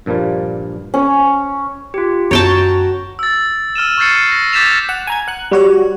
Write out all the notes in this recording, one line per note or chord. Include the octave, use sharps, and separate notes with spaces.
G2 A#2 F3 G3 A#3
C#4
F4 G4
F#2 D3 F#4 C#5 G5 A5 A#5 A6
E6 A6
E6 F6 D#7 E7
C#6 F6 G6 A6 C7 C#7
A#6
D6 G6 A6 B6 E7 F7
F#5
G#5 A#5 G#6
F#5 F#6
G3 F#4 C#5